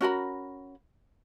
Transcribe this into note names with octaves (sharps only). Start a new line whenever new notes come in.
C#4 F#4 A#4 B5